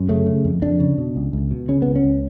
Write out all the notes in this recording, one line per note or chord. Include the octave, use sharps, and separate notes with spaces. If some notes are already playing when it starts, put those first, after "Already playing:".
Already playing: F#2
C#3 A3
C#3
F2
F2 D4
C#3
B2
C#2
C#2
B2
C#3 C#4
C#2 B3
C#4
C#2